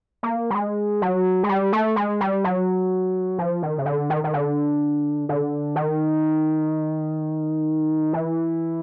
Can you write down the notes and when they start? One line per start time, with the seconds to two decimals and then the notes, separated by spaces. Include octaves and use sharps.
0.23 A#3
0.50 G3
0.55 G#3
1.02 F#3
1.43 G#3
1.49 G3
1.73 A3
1.96 G#3
2.21 G3
2.44 F#3
3.38 F3
3.62 D#3
3.78 C#3
3.86 D3
4.10 D#3
4.24 D#3
4.33 D3
5.29 D3
5.76 D#3
8.13 E3